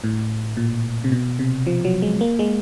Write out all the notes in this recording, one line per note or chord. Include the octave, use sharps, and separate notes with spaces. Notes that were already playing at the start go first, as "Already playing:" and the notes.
A2
A#2
C3
B2
C3
F3
F#3
G#3
A#3
G#3